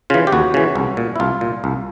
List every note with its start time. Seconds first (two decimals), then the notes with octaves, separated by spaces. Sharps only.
0.10 C#3 E3 F4
0.27 G4
0.32 D#2 F#4
0.54 C#3 E3
0.76 C2
0.97 A#2
1.16 E4
1.20 C2 F4
1.41 A#2
1.64 C2